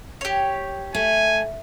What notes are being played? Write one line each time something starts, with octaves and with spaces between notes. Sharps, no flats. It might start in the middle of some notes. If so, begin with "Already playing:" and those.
G4 C#5
A3 G#5